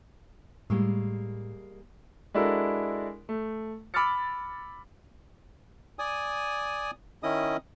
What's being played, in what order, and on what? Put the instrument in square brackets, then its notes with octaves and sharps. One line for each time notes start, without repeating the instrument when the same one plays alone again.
[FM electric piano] A2 [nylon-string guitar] G3 G#3 A#3
[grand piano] G#3 D4 E4 F#4 A4 A#4
A3
B5 D6 E6 F6 A6 C#7
[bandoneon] D5 G#5 D#6
D#3 C#4 E4 D#5 D#6